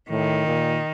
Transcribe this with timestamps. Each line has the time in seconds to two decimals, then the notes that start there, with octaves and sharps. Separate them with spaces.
0.10 A2 D#3
0.47 A#2